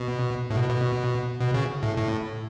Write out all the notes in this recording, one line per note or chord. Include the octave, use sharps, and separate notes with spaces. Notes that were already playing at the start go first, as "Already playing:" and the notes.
Already playing: B2
A2
B2
B2
B2
C#3
A2
A2